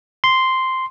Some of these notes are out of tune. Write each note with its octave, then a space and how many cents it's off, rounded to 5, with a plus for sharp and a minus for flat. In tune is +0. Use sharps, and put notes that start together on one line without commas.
C6 -5